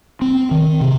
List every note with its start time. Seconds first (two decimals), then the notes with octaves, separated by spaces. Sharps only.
0.22 C4
0.51 D#3
0.81 C3